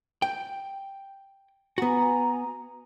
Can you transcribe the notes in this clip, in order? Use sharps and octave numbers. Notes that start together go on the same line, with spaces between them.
G5
B3 F#4 G#5 A#5